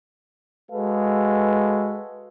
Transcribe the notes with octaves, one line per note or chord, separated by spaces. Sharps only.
G#3 F#4 A4 B4 F5